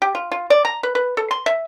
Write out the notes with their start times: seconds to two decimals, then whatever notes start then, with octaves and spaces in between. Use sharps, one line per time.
0.02 G4
0.15 F4
0.32 F4
0.50 D5
0.65 A#5
0.83 B4
0.95 B4
1.17 A4
1.31 C6
1.46 E5